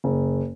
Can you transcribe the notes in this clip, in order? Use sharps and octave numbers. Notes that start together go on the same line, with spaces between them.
F#1